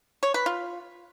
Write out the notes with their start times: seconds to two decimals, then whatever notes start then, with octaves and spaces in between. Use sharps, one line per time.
0.23 C#5
0.34 B4
0.46 F4